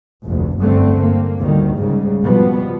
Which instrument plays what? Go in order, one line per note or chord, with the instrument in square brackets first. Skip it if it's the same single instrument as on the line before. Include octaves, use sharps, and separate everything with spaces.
[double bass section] F1 D2
G1 F#2 D3 A3 C4
A#3
D2 D#3 G3
G#2 C#3 G3
B2 F3 G3 B3